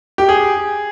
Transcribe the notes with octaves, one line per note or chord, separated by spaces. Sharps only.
G4
G#4